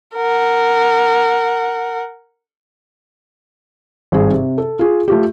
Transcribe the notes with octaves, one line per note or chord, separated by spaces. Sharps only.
A#4 F#5
G#1 G2 G#4
C3
A4
F4 G#4
A3 F4 G4